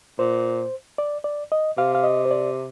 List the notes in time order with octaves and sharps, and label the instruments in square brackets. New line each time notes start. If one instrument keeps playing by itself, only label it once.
[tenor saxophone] A#2 [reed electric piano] C5
[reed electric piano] D5
D5
D#5
[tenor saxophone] C3 [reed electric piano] F5
[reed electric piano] F5
D#5
C5
D5